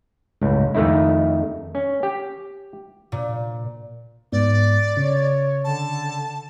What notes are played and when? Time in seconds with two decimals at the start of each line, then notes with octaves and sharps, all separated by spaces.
0.41 G1 C#2 A2
0.74 F2 D#3 A3 D#4 E4
1.75 C#4
2.03 G4
3.12 A#2
4.32 G#2 B3 D5
4.97 C#3 C#5
5.64 D3 A5